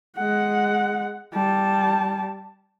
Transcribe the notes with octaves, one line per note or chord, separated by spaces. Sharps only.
G#3 F#5
G3 A5